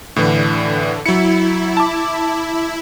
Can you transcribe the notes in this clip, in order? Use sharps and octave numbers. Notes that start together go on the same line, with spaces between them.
A2 D3 E3
F#3 E4 C#7
A5 D6